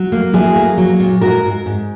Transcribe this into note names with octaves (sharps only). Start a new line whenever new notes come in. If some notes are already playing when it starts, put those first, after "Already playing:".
Already playing: F#3
A#3
F#3 E4 G#4
A#3
F#3
A#2
G#2 F#4 A#4
G#2
G#2